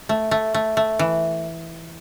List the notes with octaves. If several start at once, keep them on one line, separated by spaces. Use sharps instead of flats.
A3
A3
A3
A3
E3